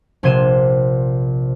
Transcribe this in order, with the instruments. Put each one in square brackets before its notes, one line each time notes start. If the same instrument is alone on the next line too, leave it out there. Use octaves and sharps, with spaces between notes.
[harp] A#1 C3 C6 G#6 D#7 E7